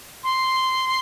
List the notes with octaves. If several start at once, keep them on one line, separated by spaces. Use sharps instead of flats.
C6